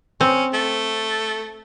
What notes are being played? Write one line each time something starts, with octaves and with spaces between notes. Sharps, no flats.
C4 C#4
A3